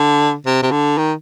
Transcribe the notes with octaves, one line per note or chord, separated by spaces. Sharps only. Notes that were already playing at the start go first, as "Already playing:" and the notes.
Already playing: D3
C3
C3
D3
D#3